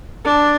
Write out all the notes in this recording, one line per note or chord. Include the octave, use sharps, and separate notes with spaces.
D4